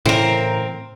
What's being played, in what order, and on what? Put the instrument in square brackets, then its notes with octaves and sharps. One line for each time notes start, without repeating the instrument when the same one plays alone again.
[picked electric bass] A2 C#3 E3 [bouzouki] C4 A#4